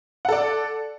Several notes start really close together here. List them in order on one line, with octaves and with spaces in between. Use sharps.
F#5 A4 D5